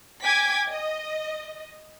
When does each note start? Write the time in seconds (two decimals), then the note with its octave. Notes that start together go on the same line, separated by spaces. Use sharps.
0.23 G5 G#5 D6 G#6 B6
0.69 D#5